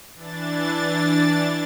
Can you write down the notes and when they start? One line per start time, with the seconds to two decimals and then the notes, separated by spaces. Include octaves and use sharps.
0.15 E3 D4 A6